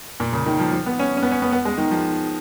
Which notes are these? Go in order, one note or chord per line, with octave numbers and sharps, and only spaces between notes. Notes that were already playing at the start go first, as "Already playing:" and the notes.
A#2
C#3
D#3
F3
F3
B3
C#4
C#4
B3
C#4
B3
B3
G#3
D#3
F3